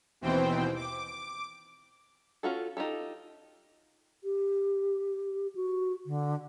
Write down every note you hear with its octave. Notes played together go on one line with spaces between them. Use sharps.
D#2 B2 E3 C4 C5 G5
D6
C#4 F4 F#4 A4
D#4 F4 G4 A4
G4
F#4
D3